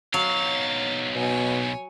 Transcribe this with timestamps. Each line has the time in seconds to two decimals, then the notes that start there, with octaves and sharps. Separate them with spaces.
0.14 B1 F#3 F5 A6
1.15 B2 C#5 G#5